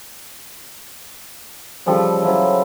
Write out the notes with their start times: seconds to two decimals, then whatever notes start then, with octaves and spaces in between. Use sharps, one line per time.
1.86 C#3 F3 G3 A4
2.22 F3 F#3 E4